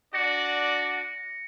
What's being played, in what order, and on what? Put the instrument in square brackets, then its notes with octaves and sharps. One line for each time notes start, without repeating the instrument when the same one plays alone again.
[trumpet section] D4 F#4 D5 [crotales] A#6 C#7